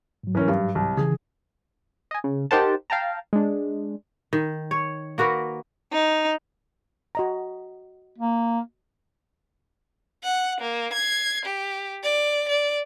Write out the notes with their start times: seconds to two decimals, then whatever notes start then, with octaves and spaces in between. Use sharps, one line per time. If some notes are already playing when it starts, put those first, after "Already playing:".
0.24 G#2 F#3
0.35 E3 C#4 A#4
0.48 G2
0.75 C2
0.97 C#3 E3 G#4
2.11 D#5 G#5
2.24 C#3
2.51 D#4 G4 A#4 C5 F#5 A5
2.90 F5 G5 A5 A#5
3.33 G#3 D4
4.33 D#3
4.71 C#5
5.18 A#3 F#4 A#4 B4
5.93 D#4
7.15 F#4 D#5 A#5
8.18 A#3
10.24 F#5
10.61 A#3
10.93 G#6 C7
11.46 G4
12.03 D5
12.49 D5